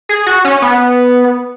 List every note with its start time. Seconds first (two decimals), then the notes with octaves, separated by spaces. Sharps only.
0.09 G#4
0.26 F#4
0.45 C#4
0.62 B3